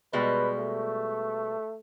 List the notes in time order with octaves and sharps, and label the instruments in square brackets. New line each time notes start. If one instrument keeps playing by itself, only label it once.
[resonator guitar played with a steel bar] B2 G3 G#3 [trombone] B4
[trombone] A3